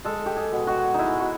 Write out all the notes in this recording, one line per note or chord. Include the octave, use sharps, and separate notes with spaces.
G#3 A4
G4
G#4
B2
F#4
G#3 D#4 E4
F#4